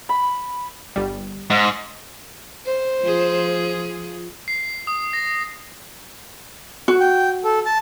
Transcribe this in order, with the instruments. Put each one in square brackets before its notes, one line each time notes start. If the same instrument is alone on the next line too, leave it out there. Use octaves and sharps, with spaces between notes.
[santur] B5
[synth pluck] G1 G3
[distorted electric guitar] G#2
[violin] C5
[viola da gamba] F3 F4 G#4
[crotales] C7
D#6
A#6
[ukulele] F#4
[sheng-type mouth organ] G5
A4
A5